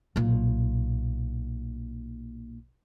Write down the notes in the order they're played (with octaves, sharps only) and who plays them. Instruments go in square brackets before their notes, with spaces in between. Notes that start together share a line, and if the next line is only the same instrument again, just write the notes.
[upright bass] B1 A#2